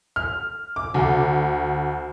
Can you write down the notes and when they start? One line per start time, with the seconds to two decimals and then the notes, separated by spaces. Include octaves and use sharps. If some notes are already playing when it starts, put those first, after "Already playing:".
0.16 F6
0.76 D6
0.94 D2